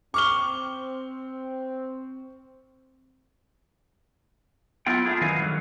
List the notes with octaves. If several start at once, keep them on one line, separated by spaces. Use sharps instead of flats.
C4 C#6 D6 F6 G7
F#3 B3 E4 F4 G5
A3 D4 E4 F4 G#4
D#3 E3 F#3 C#4 D#5 F5
D3 D#3 F#3 G3